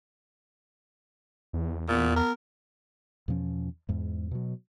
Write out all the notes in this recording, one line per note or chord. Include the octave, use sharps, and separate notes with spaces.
E2
A#2 B3
A#4
E2 B2 F3 C#4
E2 G#2
B2 F#3